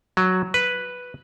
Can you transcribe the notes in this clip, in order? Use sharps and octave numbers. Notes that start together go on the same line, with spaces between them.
F#3
B4